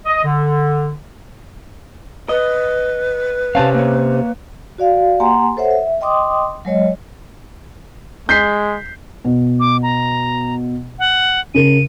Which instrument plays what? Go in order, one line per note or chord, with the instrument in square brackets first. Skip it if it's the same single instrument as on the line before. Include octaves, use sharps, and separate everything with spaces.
[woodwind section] D#5
D3
[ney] B4 [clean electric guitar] D#5
[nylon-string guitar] C3 C4 C#4 [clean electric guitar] F5 A5
[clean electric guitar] A#3 C#5
[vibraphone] F#4 D5 F5
A#3 G4 F#5 G#5 A#5 C6
A4 C5 C#5 E5 F#5
E5
D#5 G5 C6 D6 D#6
F#3 G#3 C#5 D#5
[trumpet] G#3 [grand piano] G6 B6 C7
[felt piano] B2
[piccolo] D6
A#5
F#5
[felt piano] C#3 A#4 [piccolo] D#7